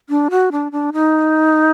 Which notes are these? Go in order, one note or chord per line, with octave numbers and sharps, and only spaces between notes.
D4
F#4
D4
D4
D#4